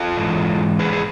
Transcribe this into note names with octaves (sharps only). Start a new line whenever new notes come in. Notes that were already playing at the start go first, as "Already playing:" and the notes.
Already playing: F4 A4
G#2 E3 G#3
G#4 B4
G#4